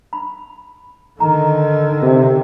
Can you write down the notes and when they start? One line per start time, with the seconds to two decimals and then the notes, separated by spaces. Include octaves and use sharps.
0.13 B5
1.20 D3 D#3 A#5
2.02 C3